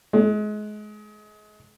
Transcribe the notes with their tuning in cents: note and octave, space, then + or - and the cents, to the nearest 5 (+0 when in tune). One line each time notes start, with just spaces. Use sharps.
G#3 +30